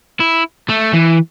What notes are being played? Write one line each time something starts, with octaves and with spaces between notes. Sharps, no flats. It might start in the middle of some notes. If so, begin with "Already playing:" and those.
E4
A3
E3